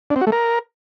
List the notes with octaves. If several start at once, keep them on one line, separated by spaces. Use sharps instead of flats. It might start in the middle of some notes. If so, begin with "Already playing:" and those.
D4
C4
F#4
A3
A#4